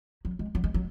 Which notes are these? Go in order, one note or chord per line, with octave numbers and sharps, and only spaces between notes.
F#3
G#3
F#3
G#3
F#3